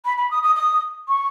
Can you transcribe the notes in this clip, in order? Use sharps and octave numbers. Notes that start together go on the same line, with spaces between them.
B5
B5
D#6
D#6
D#6
C#6